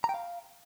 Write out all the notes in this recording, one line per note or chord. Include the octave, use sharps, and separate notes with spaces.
A#5
G5
F5